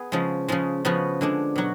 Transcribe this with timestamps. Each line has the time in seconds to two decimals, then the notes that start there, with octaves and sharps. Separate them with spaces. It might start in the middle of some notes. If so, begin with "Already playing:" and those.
Already playing: B3 G#4
0.12 C#3 F3 G#3
0.48 C#3 F3 G#3
0.85 C#3 F3 B3 F#4
1.21 D3 G#3 D4
1.56 B2 F#3 F#4